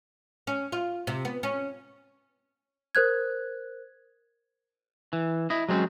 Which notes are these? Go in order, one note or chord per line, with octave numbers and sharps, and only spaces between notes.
C#4
F4
C3
B3
C#4
A#4 C5 F#6 G#6
E3
E4 D#5
F#3 G#3 C4 C#4